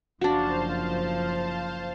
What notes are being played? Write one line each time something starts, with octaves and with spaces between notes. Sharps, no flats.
F#1 F3 D4 F#4 C5 F5 A5